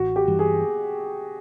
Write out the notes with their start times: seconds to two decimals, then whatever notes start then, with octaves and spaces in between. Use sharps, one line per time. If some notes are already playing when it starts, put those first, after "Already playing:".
Already playing: A1 F#4
0.16 G4
0.27 G2 E3 G3
0.39 G#4